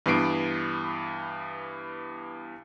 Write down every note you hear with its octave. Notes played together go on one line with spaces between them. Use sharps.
G2 E3 B3 C7 D7